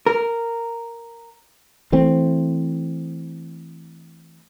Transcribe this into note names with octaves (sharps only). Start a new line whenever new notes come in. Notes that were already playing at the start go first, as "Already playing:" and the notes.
A#4
E3 A3 C4